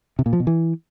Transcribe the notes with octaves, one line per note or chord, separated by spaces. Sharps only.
C3
A#2
F3
B2
E3